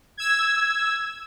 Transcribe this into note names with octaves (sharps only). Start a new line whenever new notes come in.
E6 G#6